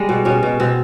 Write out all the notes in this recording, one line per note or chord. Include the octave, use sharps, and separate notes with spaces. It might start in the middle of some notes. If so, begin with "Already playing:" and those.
Already playing: G3 G#3
B2
B2 C#4
B2
B2 C4